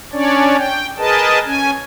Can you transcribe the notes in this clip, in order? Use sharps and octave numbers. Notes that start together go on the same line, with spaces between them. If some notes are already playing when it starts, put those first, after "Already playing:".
C#4 D4 C#5 D5
G5
G#4 A#4 B4 D#5 A5
C#4 G#5